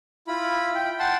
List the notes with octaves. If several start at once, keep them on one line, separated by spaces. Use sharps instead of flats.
E4 F4 B5
G5
F#5 G5 A5 C6